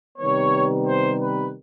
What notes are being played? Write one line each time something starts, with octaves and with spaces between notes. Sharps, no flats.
C3 D#3 G3 B3 C#5
C5
B4